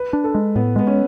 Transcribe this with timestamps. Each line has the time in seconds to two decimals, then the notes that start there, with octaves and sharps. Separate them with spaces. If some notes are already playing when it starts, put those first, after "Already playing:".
Already playing: B4
0.13 D4
0.24 A4
0.35 G#3
0.55 A2 B3
0.76 G#3 B3
0.87 C#4